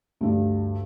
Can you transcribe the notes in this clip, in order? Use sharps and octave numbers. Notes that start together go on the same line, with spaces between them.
D2 G2